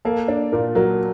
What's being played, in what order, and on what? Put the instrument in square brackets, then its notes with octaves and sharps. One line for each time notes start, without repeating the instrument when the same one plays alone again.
[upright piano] A#3 [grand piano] A4
[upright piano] D4
[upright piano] A#2 [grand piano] A#4
[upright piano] F#3 [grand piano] A#4